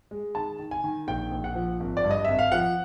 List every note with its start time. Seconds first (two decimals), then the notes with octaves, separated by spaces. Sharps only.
0.11 G#3
0.35 D#3 A5
0.59 D#3
0.71 G#5
0.84 D#3
1.07 A#1 G5
1.31 A#1
1.44 F#5
1.55 F3
1.80 G#1
1.97 D5
2.04 G2
2.11 D#5
2.25 G#1 E5
2.39 F5
2.52 F3 F#5